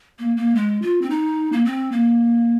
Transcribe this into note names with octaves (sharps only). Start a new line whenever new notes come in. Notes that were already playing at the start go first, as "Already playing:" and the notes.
A#3
A#3
G#3
F4
C4
D#4
A#3
C4
A#3